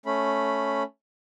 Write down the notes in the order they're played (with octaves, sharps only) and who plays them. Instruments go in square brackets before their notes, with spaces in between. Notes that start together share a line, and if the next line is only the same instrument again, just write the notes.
[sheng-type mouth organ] A3 C#4 B5